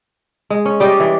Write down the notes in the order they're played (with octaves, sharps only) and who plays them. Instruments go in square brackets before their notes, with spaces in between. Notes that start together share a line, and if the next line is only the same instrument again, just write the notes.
[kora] G#3
C#4
[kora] G3 G4 D#5 [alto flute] D5
[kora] E3